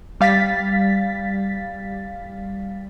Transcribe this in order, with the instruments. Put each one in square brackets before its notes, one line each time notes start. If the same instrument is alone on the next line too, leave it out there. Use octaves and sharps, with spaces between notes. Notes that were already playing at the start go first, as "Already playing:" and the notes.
[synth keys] G3 F5 A6 B6